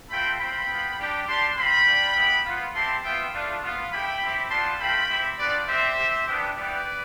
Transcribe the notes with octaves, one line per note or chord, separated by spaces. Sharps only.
A3 C4 F4 G5 B5
C4 F4 G5 B5
B3 F4
G3 D4 G4
G3 D4 G4 A5 C6
C4 F4 G5 B5
G3 D4 F4
B3 E4 G4
B3 F4
C4 E4 G4 A5 C6
B3 F4 E5 G5
A3 D4 F4
B3 F4
A3 E4 G4 G5 B5
C4 E4 G4
G3 B3 F4 A5 C6
A3 C4 F4 G5 B5
C4 E4 G4
G3 B3 D4 F4 B4 D5
G3 C4 G4 C5 E5
C4 G4
B3 D4 G4
G3 B3 E4 G4 B4 D5